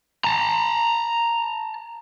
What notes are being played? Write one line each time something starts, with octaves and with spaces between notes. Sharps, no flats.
A5 A#5